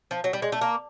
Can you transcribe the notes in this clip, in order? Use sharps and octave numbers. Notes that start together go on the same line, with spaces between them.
F3
F#3
G3
G#3
A3
A#3